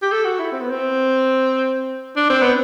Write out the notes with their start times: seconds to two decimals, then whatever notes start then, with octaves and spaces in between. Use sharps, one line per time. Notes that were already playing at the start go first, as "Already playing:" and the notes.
0.02 G4
0.12 A4
0.25 F#4
0.39 E4
0.52 C4
0.62 B3
0.70 C4
2.16 D4
2.30 C4
2.42 B3